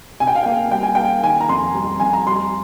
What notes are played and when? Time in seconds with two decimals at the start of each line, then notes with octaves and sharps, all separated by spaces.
0.20 C3 G#5
0.27 G5
0.35 F5
0.43 A#3 G5
0.71 G3 G5
0.83 G#5
0.95 A#3 G5
1.23 D#3 G#5
1.41 A#5
1.49 F2 C6
1.74 G3
2.00 F2 G#5
2.13 A#5
2.27 G3 C6